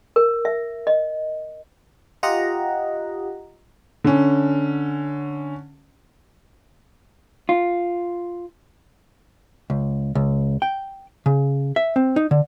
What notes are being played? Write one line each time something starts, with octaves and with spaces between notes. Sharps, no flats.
A#4
E5
D#5
F4 G4 D#5 F#5 A#5
D3 C#4
F4
C#2
C#2
G5
C#3
E5
C4
D#4
D3